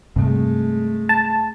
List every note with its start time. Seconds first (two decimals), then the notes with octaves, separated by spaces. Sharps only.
0.16 G2 C3 G#3 A3
1.09 A5